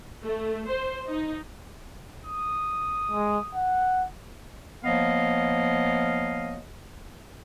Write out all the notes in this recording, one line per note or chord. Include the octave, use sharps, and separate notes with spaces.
A3
C5
D#4
D#6
G#3
F#5
F3 A#3 B3 C#5 D#5 F5